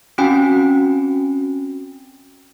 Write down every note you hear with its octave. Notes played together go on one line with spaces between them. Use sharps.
C4 C#4 F#4 G5 G#5